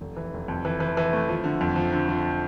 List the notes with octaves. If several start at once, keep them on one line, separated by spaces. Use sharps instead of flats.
F1
E3
F1
F2
E3
E3
E3
A3
F3
D3
F2
F3
D3
F3